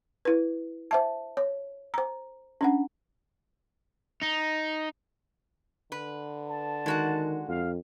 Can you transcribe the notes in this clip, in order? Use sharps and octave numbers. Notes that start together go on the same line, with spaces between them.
E4 B4
C5 E5 A5
C#5
C5 A#5
C#4 D4 F#5
D#4
D3 B4
A5
D#3 G#3 F#4 F#5
F2 F5